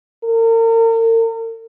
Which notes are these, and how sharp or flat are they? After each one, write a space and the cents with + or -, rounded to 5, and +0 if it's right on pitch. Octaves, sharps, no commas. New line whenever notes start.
A#4 -40